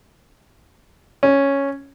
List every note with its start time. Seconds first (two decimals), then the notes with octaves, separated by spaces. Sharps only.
1.23 C#4